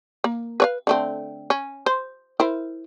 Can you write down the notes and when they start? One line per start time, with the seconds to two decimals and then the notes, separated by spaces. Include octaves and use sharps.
0.24 A#3
0.60 B4 C#5 F5
0.87 D3 A3 C4
1.50 C#4
1.86 C5
2.40 E4 A#4 C5